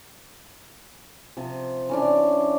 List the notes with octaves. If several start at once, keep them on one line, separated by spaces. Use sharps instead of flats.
C3 F3
E3 C#4 D4